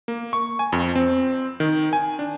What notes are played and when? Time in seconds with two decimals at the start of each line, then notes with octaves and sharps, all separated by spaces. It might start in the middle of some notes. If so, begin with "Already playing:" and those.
0.08 A#3
0.33 C#6
0.59 G#5
0.72 F2
0.95 C4
1.60 D#3
1.93 G#5
2.19 D4